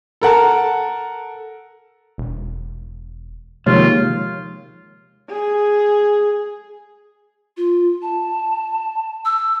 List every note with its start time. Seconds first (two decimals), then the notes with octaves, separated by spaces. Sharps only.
0.21 A4 A#4 F#5 A5
2.18 E1
3.66 D#2 C3 F3 G#3 F4 C#5
5.29 G#4
7.57 F4
8.02 A5
9.25 E6